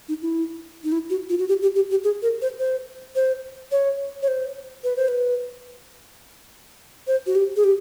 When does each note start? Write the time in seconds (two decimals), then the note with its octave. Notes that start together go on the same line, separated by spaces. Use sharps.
0.09 D#4
0.22 E4
0.84 D#4
0.92 E4
1.10 F#4
1.29 F4
1.39 F#4
1.49 G4
1.62 G4
1.75 G4
1.90 G4
2.04 G#4
2.22 A#4
2.42 C5
2.59 C5
3.15 C5
3.72 C#5
4.22 C#5
4.28 C5
4.84 B4
4.97 C5
5.08 B4
7.07 C5
7.26 F#4
7.35 G4
7.56 G#4
7.64 G4